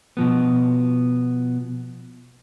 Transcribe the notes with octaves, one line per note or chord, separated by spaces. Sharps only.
B2 F3 B3